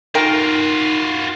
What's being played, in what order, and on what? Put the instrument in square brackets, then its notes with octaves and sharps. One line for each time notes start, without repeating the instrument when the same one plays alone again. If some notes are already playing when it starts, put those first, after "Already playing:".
[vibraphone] D#4 [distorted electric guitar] F4 F#4 [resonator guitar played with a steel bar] A#4 G5